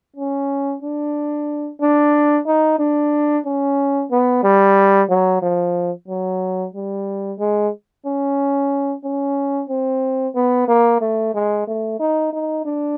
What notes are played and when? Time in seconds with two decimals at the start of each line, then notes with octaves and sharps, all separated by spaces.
0.16 C#4
0.82 D4
1.81 D4
2.47 D#4
2.79 D4
3.46 C#4
4.11 B3
4.44 G3
5.10 F#3
5.42 F3
6.08 F#3
6.74 G3
7.39 G#3
8.06 C#4
9.04 C#4
9.69 C4
10.35 B3
10.68 A#3
11.01 A3
11.35 G#3
11.67 A3
12.00 D#4
12.33 D#4
12.66 D4